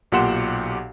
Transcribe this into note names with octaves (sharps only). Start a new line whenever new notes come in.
B1 A#2 G4 F#5 C6 E7